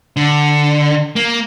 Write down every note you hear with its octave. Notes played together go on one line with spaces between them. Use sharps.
D3
A#3